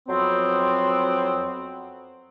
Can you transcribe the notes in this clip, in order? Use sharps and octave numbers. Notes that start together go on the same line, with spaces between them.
F2 F#3 B3 C4